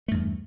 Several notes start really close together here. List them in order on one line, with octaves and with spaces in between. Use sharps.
A3 G2 E2